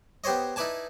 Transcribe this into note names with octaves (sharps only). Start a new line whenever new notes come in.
B3 G4 C5 C#5 D#5
D#4 E4 B4 D5 G#5 A5